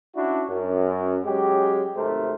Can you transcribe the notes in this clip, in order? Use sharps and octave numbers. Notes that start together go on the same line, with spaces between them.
C#4 D4 E4 F#4
F#2
F#3 G#3 C#4 G4
G#1 C3 A3 A#4 C5